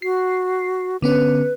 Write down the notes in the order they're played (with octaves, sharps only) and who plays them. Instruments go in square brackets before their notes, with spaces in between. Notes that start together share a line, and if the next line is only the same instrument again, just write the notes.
[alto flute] F#4 [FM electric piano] C7
[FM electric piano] D3 B3 C#4 [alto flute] B4